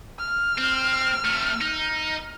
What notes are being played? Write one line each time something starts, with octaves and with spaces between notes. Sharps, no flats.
F6
C4
C3 A3
D#4